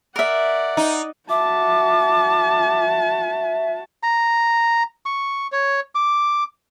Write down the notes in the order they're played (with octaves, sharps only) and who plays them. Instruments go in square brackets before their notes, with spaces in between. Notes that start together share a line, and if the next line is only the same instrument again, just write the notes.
[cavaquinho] A#4 E5 [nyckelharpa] D5 F#5
[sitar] D#4
[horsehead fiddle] F#4 A5 [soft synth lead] E5 [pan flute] D6
[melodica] A#5
C#6
C#5
D6